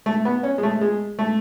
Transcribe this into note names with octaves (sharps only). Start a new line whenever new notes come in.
A3
B3
C#4
G#3
A3
G#3
A3